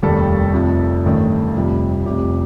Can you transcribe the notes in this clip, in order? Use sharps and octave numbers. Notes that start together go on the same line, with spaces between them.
F1 D#2 D#3 G3 A4
F1 F2 C3
A1 G2 D#3 A3
F1 F2 C3 G3
F1 F2 C3 G4